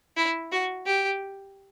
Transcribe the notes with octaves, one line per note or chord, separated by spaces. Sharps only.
E4
F#4
G4